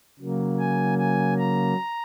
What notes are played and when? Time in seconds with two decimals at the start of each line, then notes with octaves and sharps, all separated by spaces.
0.20 C#3 F#3 A#3
0.59 G#5
0.99 G#5
1.38 A#5